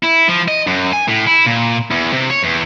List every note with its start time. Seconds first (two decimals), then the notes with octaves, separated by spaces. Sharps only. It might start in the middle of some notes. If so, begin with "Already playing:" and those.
0.03 E4
0.28 F3
0.48 D#5
0.67 F#2
0.93 G#5
1.09 A2
1.27 E4
1.47 A#2
1.91 E2
2.13 C3
2.31 C#5
2.44 E2